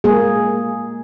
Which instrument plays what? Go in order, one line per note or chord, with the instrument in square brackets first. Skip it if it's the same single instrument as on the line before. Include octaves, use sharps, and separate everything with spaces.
[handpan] G#3 A#3 G#4